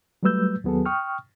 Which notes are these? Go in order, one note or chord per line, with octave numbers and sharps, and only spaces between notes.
F#3 G3 A3 B4 E6 G6
D#2 F#3 B3 G#4 A4
G5 C#6 D#6 F6